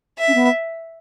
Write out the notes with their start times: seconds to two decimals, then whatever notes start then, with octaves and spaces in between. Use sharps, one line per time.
0.19 E5
0.28 C#4
0.34 B3